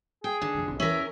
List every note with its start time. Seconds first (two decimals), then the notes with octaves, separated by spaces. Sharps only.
0.24 G#4 G5
0.42 D3 D#3
0.54 F2 C3
0.68 B1 C4
0.80 E2 E3 C#4 A#4 E5